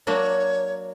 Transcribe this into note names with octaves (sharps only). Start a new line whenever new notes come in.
F#3 A#3 D4 F#4 C#5